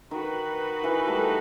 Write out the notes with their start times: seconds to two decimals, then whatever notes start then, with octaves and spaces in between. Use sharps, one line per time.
0.11 D#3 D#4 F#4 B4
0.84 E3
1.07 G3 A3